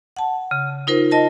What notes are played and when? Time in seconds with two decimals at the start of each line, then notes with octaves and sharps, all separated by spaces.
0.16 F#5 A5
0.51 C#3
0.87 D#4 F4 A#4 C5
1.11 D#5 A5 A#6